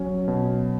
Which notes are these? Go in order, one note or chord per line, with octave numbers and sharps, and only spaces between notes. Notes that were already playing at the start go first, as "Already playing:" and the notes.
Already playing: F#3 C#4
B2